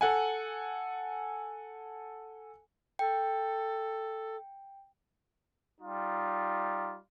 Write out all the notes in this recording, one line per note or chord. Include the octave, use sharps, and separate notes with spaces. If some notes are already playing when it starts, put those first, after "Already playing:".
A4 F#5 G#5
A4 G5
G3 D#4 F4